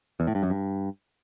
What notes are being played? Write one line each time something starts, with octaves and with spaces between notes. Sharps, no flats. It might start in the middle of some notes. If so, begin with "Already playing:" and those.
E2
A2
G2
F#2
G2